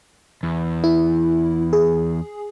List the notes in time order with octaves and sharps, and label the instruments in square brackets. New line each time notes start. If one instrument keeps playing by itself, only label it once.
[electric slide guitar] E2
[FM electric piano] E4
G#4